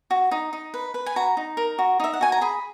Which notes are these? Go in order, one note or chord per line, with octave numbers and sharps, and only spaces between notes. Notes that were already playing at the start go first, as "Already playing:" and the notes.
F#4
D#4
D#4
B4
B4
G#5
F#4 A#5
D#4
A#4
F#4
D#4 E5
F#5
F#4 G#5
A#5
G#4 B5